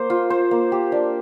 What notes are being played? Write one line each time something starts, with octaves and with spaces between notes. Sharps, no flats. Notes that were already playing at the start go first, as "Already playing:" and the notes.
Already playing: A#3 C5
F4
C5
A#3
G4
D4